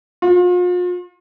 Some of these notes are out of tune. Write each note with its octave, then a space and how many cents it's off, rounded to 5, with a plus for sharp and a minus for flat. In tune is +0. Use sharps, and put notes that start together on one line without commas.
F4 +40